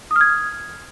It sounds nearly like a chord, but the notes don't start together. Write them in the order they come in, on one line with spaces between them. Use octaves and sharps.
D#6 F6 G#6